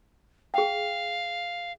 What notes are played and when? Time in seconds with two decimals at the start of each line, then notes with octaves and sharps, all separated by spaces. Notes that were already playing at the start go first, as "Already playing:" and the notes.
0.54 G#4 F5 G5